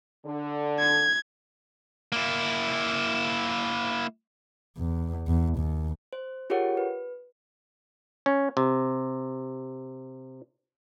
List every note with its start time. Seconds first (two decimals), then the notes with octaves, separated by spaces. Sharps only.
0.24 D3
0.79 G#6
2.12 A#3 E4
4.77 E2
5.27 E2
5.59 D#2
6.13 C5
6.50 F4 G4 G#4 A#4 C#5 F#5
6.77 B4
8.26 C#4
8.57 C3